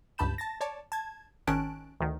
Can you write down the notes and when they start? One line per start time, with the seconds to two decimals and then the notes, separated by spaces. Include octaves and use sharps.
0.18 C#2 G2 A5 B5 G6 E7
0.38 A5 A6 A#6
0.61 C#5 D5 A5
0.92 A5 G#6
1.47 G#1 D#3 C#4 A5 F#6 D7
2.00 D2 D#3